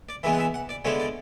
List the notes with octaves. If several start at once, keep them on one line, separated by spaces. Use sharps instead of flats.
D5
E3 G#3 B3 E5
F#5
E5
F#5
D5
D3 G#3 B3 E4 C#5
D5